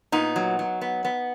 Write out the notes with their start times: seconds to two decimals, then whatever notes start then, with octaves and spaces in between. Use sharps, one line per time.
0.12 A#2 B3 D#4
0.36 F#3
0.59 F#3
0.81 B3
1.05 B3